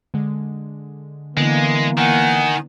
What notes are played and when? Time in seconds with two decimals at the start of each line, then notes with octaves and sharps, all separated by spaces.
0.14 D3 G#3
1.37 D3 E3 G#3 A#3 B3
1.97 D#3 F#5 G#5